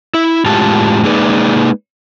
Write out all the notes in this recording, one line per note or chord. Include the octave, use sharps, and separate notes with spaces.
E4
A2 G#3 F4 G4 A5
G#3 A#3 D#4 G#4 B4 D5